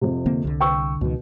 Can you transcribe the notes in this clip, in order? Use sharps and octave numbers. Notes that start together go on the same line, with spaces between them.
F2 C3
D3 A#3 C4
C2 D3
G5 C#6 E6
C#2 B2 D#3